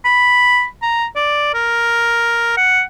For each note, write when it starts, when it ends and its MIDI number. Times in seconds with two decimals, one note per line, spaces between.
0.05 0.66 83
0.82 1.06 82
1.16 1.49 74
1.54 2.55 70
2.57 2.82 78